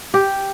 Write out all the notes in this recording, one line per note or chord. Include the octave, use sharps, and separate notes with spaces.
G4